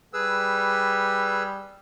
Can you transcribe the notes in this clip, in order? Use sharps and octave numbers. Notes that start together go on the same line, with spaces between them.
G3 G#4 B4 E6